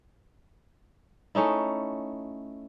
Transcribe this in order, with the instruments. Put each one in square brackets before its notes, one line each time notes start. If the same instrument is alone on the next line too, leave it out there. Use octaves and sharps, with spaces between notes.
[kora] A3 C#4 D#4 E4